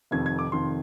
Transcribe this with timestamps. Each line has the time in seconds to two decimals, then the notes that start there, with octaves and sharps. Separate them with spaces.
0.11 F1 F2 D#3 G#6
0.26 G#6
0.39 D6
0.52 F1 F2 D#3 C6